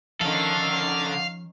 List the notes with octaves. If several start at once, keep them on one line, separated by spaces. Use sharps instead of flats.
D3 D#3 F3 C#4 A4 F5